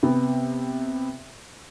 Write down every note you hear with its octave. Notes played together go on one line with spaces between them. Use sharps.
C3 B3